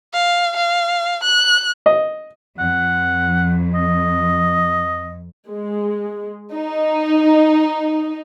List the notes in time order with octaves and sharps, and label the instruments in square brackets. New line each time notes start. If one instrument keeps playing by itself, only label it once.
[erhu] F5
F5
F#6
[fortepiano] D#5
[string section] F2 [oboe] F#5
[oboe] D#5
[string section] G#3
D#4